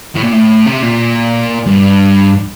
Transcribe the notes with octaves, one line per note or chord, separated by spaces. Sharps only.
A2
A#2
A2
C3
A#2
G2